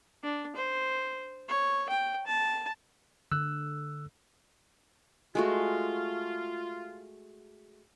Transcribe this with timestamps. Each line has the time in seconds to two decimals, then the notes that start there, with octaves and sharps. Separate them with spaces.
0.23 D4
0.56 C5
1.48 C#5
1.90 G5
2.27 A5
3.32 D3 E6 F#6
5.35 G#3 A3 F4 F#4